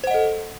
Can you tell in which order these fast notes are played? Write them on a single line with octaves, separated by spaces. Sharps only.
C5 F#5 D#5 A4